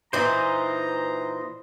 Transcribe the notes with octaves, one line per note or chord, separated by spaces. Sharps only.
A#2 E3 D#4 C5 A#5